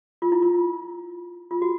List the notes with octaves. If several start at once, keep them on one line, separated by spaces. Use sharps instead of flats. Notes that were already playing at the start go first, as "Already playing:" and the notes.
F4
E4
F4
F4
F#4